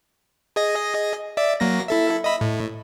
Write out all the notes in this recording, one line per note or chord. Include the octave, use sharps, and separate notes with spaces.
G#4 D#5 A#6
D5 E5
F#3 A#3 A#6
E4 A4 E5
D#5 E5 B5
A2